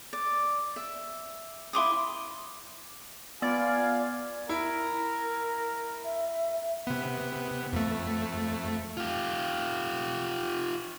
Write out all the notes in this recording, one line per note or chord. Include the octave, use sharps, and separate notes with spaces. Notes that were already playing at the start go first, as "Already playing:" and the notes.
D5
E5
E4 C6 D6 D#6
B3 F4 D5 F5 G#5 B5
E4 A#4
E5
C3 B3
F2 A3
F4 G4